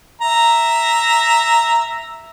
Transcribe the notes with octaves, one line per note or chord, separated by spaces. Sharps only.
E5 A#5